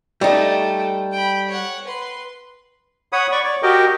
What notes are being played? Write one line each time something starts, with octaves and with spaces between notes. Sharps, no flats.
G3 A3 D#4 G5
G5 B5
C#5 F#5
B4 C6
C#5 F#5 B5 D#6
D5 B5 C#6
C#5 D5
F#4 G4 A#4 D#5 G5